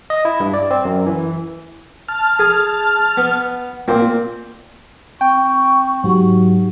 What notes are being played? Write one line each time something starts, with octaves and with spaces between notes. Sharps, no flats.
D#5
E4
G2
D5
C4
F#2
E3
A5 F6
G#4
B3
A#2 A#3 C4 F4
C4 G5 C#6
G#2 F#3 D#4 G4 F#5